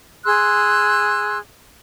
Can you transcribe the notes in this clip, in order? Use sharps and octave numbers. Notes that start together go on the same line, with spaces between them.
G#4 C6 E6 F#6